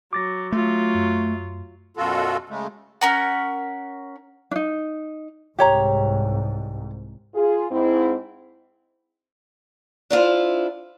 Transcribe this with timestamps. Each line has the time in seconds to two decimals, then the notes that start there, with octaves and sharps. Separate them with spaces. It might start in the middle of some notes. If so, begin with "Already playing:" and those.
0.13 F#3 D6 A6 A#6
0.52 F#3 A3 F4
0.95 F#2
1.97 F#2 B2 F4 F#4 A4
2.49 C#3 G#3 A3
3.01 C#4 A#4 F#5
4.51 D4 D#4
5.59 C2 G#2 G4 C#5 A#5
7.34 F4 G#4
7.71 G#2 C4 E4
10.10 D4 E4 F4 C5